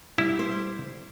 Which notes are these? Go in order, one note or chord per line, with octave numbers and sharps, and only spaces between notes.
G3 E4
C5